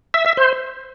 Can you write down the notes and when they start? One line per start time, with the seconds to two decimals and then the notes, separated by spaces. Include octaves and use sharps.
0.14 E5
0.26 E5
0.37 C5